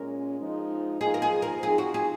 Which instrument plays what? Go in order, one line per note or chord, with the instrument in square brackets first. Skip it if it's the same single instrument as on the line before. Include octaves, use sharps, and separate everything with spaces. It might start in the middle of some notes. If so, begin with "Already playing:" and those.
Already playing: [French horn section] A#2 G#3 C#4 [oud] A#4
[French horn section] F3 G#3 D#4
[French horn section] F3 A#3 D#4 [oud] G#4
[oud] A#4
G#4
A#4
[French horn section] F3 C4 D#4 [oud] G#4
[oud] F#4
G#4